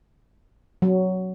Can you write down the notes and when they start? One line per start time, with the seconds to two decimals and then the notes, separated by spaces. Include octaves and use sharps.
0.82 F#3